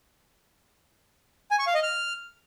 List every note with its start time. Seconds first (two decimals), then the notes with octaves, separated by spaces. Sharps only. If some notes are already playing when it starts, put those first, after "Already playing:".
1.51 G#5
1.59 C#6
1.67 F5
1.75 D#5
1.83 F6